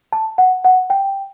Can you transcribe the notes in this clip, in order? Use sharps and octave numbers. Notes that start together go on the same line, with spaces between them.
A5
F#5
F#5
G5